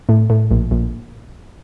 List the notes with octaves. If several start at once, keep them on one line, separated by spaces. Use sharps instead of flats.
A2
A2
A#1
A#1